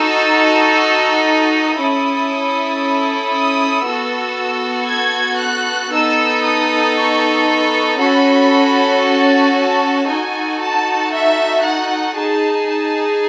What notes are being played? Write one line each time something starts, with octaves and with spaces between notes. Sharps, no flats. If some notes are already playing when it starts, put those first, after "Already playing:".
Already playing: D#4 F#4 A4 E6
E6
D#6
C#4 E4 A4
D#6
B3 F#4 A4 E6
G#6
F#6
B3 D#4 A4 E6
D#6
C#6
C#6
C#4 F#4 A4 B5
A5
A5
D#4 F#4 A4 G#5
A5
E5
F#5
D#4 G#4 A5
A5